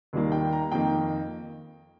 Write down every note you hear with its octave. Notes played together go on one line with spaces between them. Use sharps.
D#2 D#3 G3 A#3
G5
A#5
F2 D#3 A#3 G5